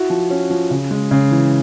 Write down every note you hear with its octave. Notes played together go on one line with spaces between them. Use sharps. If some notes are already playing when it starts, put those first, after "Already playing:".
Already playing: E4 F#4
F3
C#4
F3
C#3
G#3
C#3
E3